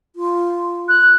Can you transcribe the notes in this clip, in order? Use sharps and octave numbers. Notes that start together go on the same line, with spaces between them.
F4
F#6